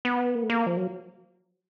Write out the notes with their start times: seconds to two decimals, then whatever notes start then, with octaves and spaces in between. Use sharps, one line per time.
0.05 B3
0.35 A#3
0.43 A3
0.50 A#3
0.67 F3
0.77 F#3